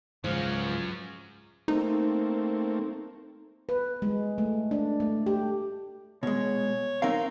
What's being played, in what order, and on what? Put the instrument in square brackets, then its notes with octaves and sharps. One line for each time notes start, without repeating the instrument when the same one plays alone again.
[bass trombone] C#2 [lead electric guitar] G#2 [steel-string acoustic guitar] F3 [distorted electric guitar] F#3 C#4
[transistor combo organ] A3 A#3 C4 [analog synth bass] D#4
[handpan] B4
G#3
A3
D4
A3
G4
[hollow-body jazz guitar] B2 G#3 [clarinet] C#5
[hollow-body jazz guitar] C4 A#4 F5 [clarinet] D#4